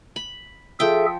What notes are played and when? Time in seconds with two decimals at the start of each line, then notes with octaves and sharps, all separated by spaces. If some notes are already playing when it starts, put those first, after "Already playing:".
0.16 B5
0.80 F3 G#4 A4 E5 G5